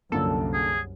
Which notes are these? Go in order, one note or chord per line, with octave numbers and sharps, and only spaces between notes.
C2 F#2 D3 F3 A#3 A4
G#4